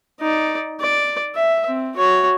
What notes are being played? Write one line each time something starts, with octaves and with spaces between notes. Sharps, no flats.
D#4 D5
D5
E5
C4
F#4 C#5